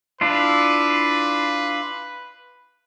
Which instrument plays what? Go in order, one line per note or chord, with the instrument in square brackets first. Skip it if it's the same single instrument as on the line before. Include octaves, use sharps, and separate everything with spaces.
[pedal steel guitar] D4 E4 F4 [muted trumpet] B4